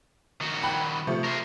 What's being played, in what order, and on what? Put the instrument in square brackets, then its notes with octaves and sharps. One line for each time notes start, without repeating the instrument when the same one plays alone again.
[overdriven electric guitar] D#3 F#4
[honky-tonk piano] G5 B5 F#6
C3 F3 A3
[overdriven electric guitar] A#4 C5